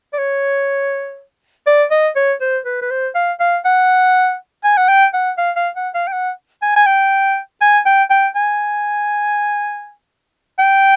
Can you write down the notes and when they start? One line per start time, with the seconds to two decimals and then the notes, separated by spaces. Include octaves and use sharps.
0.13 D5
0.18 C#5
1.66 D5
1.91 D#5
2.16 C#5
2.41 C5
2.65 B4
2.82 B4
2.91 C5
3.15 F5
3.40 F5
3.65 F#5
4.64 G#5
4.77 F#5
4.88 G5
5.13 F#5
5.38 F5
5.56 F5
5.76 F#5
5.94 F5
6.08 G5
6.13 F#5
6.62 G#5
6.76 G#5
6.86 G5
7.61 G#5
7.86 G5
8.10 G5
8.35 G#5
10.59 G5